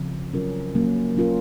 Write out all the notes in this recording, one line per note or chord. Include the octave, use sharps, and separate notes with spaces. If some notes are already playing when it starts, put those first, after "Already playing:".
Already playing: C#3 F3 C4
F#3 C#4 F4 A#4
F#3 A#3 C#4
F#3 C#4 F4 A#4